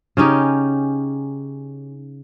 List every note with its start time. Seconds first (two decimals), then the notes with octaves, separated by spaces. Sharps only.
0.17 C#3 C#4 D#4 G4